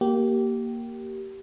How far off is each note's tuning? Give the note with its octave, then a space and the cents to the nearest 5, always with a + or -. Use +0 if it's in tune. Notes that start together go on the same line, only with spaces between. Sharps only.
A#3 +0 G4 -20